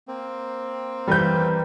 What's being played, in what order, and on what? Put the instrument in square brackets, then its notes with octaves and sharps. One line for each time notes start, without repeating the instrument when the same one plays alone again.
[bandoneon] A#3 C4
[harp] E3 A#4 B4 [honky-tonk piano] G3 G6